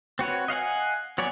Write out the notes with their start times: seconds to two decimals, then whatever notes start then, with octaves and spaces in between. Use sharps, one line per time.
0.19 C4 F#4 B4 C#5
0.48 D#5 F5 F#5 G#5
1.18 F#3 B3 C#5 D5 G#5